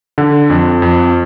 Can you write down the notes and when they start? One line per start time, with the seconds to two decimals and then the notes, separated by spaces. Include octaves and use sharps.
0.18 D3
0.50 F2
0.82 F2